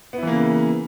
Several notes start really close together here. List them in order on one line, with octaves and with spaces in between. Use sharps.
B3 E4 E3 A#3 C#3